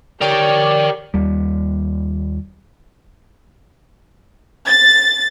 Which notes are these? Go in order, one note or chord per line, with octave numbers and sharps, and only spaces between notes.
G4 A#4 C#5 D5 G5
D#2 G3
A6